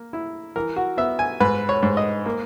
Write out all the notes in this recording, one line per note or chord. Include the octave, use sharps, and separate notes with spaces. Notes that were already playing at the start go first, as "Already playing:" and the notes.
Already playing: A#3
E4
E3 A#4
F#4
B3 E5
G#5
G#2 B4
C#5
G#2
D#5
A#3